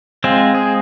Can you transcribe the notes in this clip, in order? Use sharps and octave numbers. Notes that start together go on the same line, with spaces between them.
G#3 C4 F4
G#4